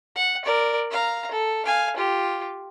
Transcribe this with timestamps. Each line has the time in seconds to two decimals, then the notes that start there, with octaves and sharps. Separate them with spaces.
0.15 F#5
0.44 A#4 D5
0.91 F5 A#5
1.31 A4
1.65 F5 G#5
1.96 F4 G4